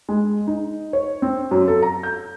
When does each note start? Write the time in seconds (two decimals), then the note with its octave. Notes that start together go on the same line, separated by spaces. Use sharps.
0.09 G#3
0.47 D#4
0.93 C#5
1.22 C4
1.51 F#2
1.68 A4
1.82 A#5
2.03 G6